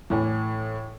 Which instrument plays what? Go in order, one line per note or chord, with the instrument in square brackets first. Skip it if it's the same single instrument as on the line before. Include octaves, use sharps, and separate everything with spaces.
[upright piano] A2 E3